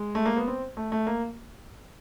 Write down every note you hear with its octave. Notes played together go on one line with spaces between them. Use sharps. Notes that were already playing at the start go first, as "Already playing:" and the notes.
Already playing: G#3
A3
A#3
B3
C4
A3
A3
A#3